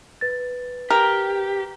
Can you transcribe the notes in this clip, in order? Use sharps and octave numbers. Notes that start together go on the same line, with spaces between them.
B4 A6
G4 A#4